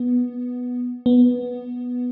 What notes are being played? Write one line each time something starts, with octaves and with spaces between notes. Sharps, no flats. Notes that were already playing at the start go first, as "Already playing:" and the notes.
Already playing: B3
B3